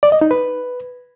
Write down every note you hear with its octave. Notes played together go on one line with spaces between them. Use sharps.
D5
D#5
D#4
B4